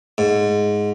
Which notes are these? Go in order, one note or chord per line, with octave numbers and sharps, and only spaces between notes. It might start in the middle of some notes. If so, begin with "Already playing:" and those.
G#2